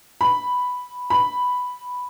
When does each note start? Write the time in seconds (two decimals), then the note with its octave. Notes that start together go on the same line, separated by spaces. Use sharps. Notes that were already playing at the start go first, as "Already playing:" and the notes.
0.21 B5
1.10 B5